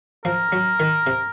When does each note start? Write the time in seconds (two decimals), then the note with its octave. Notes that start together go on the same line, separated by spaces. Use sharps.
0.25 F3 A#4
0.52 F#3
0.80 D#3
1.07 C3